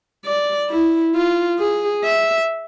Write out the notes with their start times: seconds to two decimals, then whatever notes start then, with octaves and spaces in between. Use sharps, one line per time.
0.26 D5
0.70 E4
1.15 F4
1.59 G#4
2.04 E5